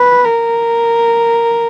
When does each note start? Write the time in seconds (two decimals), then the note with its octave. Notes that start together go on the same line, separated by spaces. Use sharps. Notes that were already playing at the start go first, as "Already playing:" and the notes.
Already playing: B4
0.24 A#4